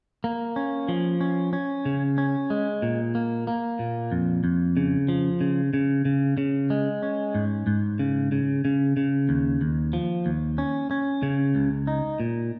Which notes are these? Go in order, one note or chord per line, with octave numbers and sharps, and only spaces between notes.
A#3
C#4
F3
C#4
C#4
C#3
C#4
G#3
A#2
A#3
A#3
A#2
F2
F2
C#3
F3
C#3
C#3
C#3
C#3
G#3
C#4
G#2
G#2
C#3
C#3
C#3
C#3
D#2
D#2
F3
D#2
C#4
C#4
C#3
C#2
D#4
A#2